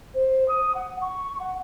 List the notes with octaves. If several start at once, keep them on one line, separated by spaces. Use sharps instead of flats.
C5
D#6
F#5
C#6
F#5